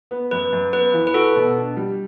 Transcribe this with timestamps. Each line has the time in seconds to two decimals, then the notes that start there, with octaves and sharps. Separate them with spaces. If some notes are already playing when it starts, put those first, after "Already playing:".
0.11 B3
0.31 F#2 B4
0.52 F#2
0.73 B3 B4
0.93 E3
1.07 B4
1.14 F#4 A4
1.36 B2
1.56 D4
1.77 G3